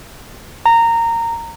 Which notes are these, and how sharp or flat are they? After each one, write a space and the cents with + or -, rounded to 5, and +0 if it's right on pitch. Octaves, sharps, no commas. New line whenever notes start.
A#5 -20